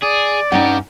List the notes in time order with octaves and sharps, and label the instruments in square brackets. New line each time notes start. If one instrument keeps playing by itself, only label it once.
[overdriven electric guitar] G#4 [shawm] D5
[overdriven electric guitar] G2 G4 [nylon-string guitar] C#4 D#4 F#5